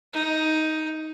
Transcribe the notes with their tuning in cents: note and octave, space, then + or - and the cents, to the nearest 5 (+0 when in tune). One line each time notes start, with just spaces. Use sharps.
D#4 +10